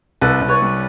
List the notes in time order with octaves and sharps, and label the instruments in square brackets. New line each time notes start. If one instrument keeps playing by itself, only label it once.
[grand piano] C2 [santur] A4 B4
[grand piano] C2
[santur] B4 C#5
[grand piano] G3